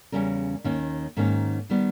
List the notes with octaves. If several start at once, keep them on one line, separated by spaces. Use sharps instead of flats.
E2 C#3 G3 C#4 A#4
D#2 D#3 A#3 C#4
G#2 D#3 A#3 C#4
D#3 G3 B3